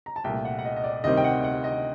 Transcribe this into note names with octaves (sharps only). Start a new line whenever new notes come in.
A#5
A5
C2 A#2 A3 G5
F#5
F#5
D#5
D#5
D5
D2 C3 D#3 G3 C4 D#5
G5
F#5
F#5
D#5